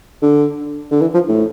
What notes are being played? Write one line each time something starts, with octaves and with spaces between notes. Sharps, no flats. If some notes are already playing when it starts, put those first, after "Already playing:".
D3
D3
E3
F3
A2